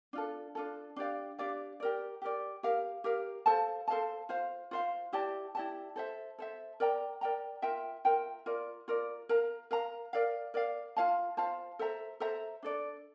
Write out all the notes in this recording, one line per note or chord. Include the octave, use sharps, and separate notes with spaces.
D4 F4 A4
D4 F4 A4
D4 G4 D5 F5
D4 G4 D5 F5
G4 A#4 D5
G4 A#4 D5
G4 A#4 F5
G4 A#4 F5
A4 C5 F5 A5
A4 C5 F5 A5
F4 C5 F5
F4 C5 F5
E4 G4 D5 A5
E4 G4 D5 A5
A4 C5 E5
A4 C5 E5
A#4 D5 G5 A#5
A#4 D5 G5 A#5
F4 A#4 E5 G5
F4 A#4 E5 G5
F4 A#4 D5
F4 A#4 D5
A#4 F5 A#5
A#4 F5 A#5
A#4 D5 F5
A#4 D5 F5
F4 C5 F5 A5
F4 C5 F5 A5
A4 C5 E5 A#5
A4 C5 E5 A#5
D4 A4 D5